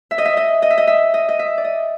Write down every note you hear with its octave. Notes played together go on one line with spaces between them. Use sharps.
E5
D#5
E5
D#5
D#5
E5
D#5
E5
D#5
D#5
E5
D5
D#5